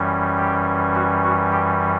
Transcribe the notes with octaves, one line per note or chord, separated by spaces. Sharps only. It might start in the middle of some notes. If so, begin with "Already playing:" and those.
Already playing: F#2 E3 G3 C#4
G4
F#4
F#4
G4